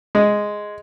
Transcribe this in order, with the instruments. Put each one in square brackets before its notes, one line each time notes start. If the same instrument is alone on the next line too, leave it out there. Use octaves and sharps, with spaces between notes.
[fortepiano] G#3